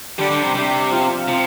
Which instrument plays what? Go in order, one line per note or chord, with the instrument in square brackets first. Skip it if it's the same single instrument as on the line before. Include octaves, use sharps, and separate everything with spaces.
[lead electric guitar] D3 [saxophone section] G3 D4 G4
[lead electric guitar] D3
C3
[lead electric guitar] C3 [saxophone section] G3 D4 G4
[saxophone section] F3 C4 F4
[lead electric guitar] C3 [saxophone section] F3 C4 F4